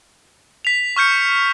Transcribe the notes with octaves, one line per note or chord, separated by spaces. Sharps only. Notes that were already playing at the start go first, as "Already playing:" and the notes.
B6 F7
C#6 F6 G6 C#7